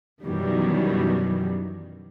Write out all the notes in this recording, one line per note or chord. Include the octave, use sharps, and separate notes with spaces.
F#2 B2 D#3 E3 F#3 G3